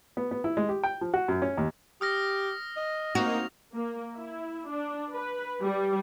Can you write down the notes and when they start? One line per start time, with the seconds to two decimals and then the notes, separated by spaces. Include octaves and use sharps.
0.17 B3
0.31 B3
0.44 E4
0.57 G#3
0.69 G4
0.84 G5
1.01 F3
1.14 F#4
1.28 F#2
1.42 C#4
1.57 D#2
2.01 G4 D#6 F6 A#6
2.76 D#5
3.15 A#3 C4 D#4 F#4 F7
3.76 A#3
4.17 E4
4.69 D4
5.14 B4
5.63 G3